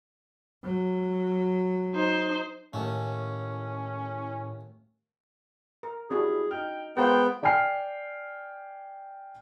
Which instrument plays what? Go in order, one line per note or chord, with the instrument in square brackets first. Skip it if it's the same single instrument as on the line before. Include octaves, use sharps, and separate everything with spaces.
[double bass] F#3
[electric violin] D#4 C5
[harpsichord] D#2 A3 [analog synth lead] A2 [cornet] C#4
[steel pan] A#4
[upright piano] G3 E4 [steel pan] C#4 D4 F#4 [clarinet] G#4
[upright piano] D#4 F6 [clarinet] G5
[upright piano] G#3 C5 C6 [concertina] B3 [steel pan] F4 A#4 [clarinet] G5
[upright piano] D5 G5 G#5 F6 C7